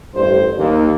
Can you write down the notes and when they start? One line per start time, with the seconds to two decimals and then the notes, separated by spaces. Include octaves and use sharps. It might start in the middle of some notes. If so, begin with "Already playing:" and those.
0.15 A1 G2 C5
0.57 D#2